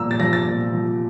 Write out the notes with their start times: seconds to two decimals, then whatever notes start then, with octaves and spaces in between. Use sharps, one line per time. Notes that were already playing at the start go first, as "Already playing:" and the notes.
Already playing: A#2 F3 A#5 E6
0.11 A6
0.20 F3 A#6
0.33 A6
0.47 A#2
0.73 F3